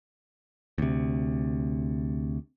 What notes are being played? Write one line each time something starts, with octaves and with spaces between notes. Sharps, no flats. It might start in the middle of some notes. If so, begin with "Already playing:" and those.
D2 C3